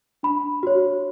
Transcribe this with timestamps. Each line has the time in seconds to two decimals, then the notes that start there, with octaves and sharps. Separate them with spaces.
0.23 D4 B5
0.63 F#4 C#5